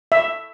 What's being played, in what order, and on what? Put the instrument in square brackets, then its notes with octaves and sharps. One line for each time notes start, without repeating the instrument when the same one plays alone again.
[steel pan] E5